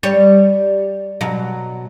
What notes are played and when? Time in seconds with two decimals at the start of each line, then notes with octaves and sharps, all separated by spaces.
0.03 G3 C#5
1.21 B2 F#3